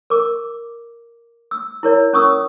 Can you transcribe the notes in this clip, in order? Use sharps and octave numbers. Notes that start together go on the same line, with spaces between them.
A#4 D6
E6
E4 A#4 C#5
C#4 A#4 C#6 D#6 E6